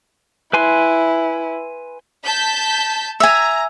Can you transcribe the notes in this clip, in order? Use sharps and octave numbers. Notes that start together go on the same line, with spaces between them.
E4 B4 G#5 C6
A5 G6 B6
E5 G#5 A#5